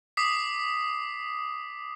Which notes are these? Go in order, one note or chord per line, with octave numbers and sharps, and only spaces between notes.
D6 D#6 B6 C7